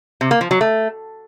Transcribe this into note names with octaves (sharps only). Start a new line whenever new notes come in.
C3
A#3
F3
F#3
A3